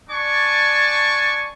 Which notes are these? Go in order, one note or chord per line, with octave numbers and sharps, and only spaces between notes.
D4 D5 G#5 A5 C#6